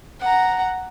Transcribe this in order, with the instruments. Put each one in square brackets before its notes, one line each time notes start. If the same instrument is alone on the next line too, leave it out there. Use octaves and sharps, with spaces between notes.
[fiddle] F#5 A#5